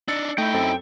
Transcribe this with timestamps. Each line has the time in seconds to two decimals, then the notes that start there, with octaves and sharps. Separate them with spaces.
0.08 D4 D#4 E6 A6 C#7
0.38 A3 D#4 E4 G5
0.54 F#2 C4 A4